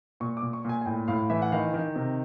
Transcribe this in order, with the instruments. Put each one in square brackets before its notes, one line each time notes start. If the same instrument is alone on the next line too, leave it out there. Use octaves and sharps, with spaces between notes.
[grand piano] A#2 C#6
D6
A#2
C#6
A#2 G#5
G#5
A2 G5
A2 F5
E3 E5
F#5
D#3 F5
D#3
C3